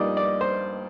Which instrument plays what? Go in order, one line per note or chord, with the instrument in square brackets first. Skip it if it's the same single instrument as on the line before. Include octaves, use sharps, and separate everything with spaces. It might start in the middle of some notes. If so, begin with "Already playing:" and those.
Already playing: [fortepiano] G2 F3 A#3 D#4 D5 D#5
D5
C5